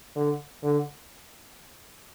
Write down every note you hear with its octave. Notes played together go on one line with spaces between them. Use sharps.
D3
D3